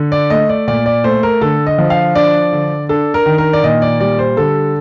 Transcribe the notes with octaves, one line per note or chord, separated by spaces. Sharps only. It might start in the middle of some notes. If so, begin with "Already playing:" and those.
Already playing: D3
D5
A3 D#5
D5
A#2 D5
D5
A3 C5
A#4
D3 A4
D#5
F3
F5
D4 D5
D3
D4 A4
A#4
D#3
A#4
D5
A#2 D#5
D5
G3 D5
C5
D3 A4